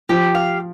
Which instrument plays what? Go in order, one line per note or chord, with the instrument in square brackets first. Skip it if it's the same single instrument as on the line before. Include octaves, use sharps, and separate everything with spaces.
[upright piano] F3 [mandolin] G4
[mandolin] F5